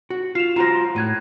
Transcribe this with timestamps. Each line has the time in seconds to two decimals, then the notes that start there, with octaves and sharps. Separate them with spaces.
0.10 F#4
0.35 F4 C7 E7 F7
0.56 F4 F#4 C5 A#5 A#6
0.96 A2 F#6 G#6 D#7